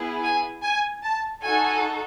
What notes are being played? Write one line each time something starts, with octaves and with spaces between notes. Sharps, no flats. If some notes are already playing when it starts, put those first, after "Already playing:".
Already playing: B3 E4 G#4
G#5
G#5
A5
D#4 F#4 A4 G#5